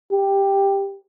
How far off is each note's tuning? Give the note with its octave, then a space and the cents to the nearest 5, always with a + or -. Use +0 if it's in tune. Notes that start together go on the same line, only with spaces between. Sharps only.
G4 +5